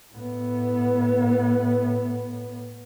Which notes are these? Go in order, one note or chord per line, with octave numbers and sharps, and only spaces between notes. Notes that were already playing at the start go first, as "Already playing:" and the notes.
A2 B3